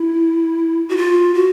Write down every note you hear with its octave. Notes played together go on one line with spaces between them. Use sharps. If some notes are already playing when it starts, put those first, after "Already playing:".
Already playing: E4
F#4
F4
F#4